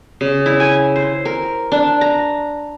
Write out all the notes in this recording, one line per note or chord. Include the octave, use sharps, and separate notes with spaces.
C#3
E4
G#5
C5
A#4
D4
A#5